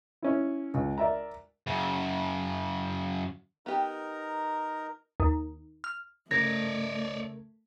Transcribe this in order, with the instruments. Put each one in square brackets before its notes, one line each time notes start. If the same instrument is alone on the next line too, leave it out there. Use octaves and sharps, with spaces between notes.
[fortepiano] C#4 E4
C#2
A#4 D5 E5 A#5
[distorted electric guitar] F#2 C#3
[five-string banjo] B3 G4 [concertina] D#4 A#4 A#5
[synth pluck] D#2
F6
[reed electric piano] C#3 A#4 G#6 [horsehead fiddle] A3 [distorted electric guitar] C#5 D5 [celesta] A#6